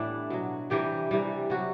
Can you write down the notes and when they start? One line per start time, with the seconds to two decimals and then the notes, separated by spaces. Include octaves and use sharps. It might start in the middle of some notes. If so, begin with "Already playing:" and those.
Already playing: A2 E3 G3 B3 D4 E4
0.30 B2 F#3
0.70 C3 E3 G3 G4
1.11 C3 E3 G3
1.50 C3 F#3 F#4